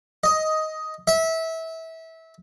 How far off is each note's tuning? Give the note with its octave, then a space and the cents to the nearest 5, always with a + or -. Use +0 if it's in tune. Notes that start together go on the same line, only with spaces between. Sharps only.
D#5 +10
E5 -25